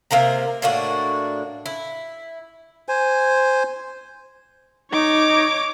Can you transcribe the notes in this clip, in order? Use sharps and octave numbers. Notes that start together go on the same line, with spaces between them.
C3 A#3 A#4 A#5
A2 A#3 D4 F#4
E4
C5 G#5
D#4 C#5 D6